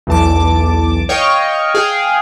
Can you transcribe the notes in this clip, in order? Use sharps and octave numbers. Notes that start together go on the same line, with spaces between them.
B1 E2 A5 D6
C#5 D#5 F5 G5 C#6
G#4 F5 G5